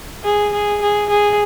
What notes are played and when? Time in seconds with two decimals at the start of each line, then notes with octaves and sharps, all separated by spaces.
0.24 G#4
0.53 G#4
0.82 G#4
1.10 G#4